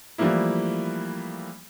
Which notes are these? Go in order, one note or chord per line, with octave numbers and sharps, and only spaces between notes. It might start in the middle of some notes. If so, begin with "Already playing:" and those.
E3 F3 G3 A3 A#3 E4